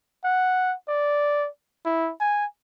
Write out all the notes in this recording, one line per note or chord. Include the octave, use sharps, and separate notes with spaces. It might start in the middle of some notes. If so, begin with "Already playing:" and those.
F#5
D5
E4
G#5